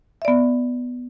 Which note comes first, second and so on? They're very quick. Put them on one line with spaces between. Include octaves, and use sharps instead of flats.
E5 D5 B3